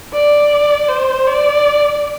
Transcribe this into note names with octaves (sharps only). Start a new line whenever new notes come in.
D5
C5
D5